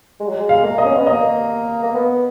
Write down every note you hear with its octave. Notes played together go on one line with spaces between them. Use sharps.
G#3
F#3
G#3
F5
A#3
D#5
C#4
B3
A#3 D#5
A#3
B3